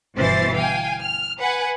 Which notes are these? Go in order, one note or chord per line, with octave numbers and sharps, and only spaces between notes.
G1 B2 E3 C5 A6 C7
F5 G5 G#5
F6
B4 F#5 G#5